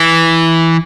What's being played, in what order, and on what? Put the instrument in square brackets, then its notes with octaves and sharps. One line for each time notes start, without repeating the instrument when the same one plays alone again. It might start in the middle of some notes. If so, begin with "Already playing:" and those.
Already playing: [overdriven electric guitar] E3